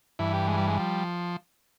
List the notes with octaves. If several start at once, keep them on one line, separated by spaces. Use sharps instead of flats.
G2 E3 E4
G4
G#3
G3
G#3
F3 G3